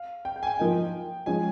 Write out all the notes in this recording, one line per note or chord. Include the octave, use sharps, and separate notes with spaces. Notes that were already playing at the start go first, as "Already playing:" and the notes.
Already playing: F5
G5
G5
G#5
G5
F3 A#3 D#4
F3 G#3 C#4 G#5